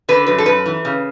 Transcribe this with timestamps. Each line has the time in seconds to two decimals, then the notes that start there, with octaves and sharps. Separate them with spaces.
0.09 D3 B4
0.27 F#2 B4
0.38 A4
0.46 F#2 B4
0.66 E3
0.85 C#3